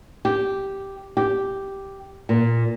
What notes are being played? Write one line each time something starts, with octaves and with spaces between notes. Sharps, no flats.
G4
G4
A#2